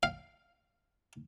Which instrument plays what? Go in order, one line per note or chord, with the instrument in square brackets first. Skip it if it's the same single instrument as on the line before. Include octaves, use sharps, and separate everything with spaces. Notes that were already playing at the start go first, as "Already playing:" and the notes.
[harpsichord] F5